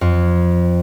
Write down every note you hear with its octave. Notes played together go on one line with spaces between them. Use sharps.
F2